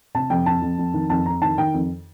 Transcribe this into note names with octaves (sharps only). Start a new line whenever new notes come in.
C3 A5
F2 G5
F2 A5
F2
F2
D#3
F2 A5
F2 A#5
D#3 A5
D#3 G5
F2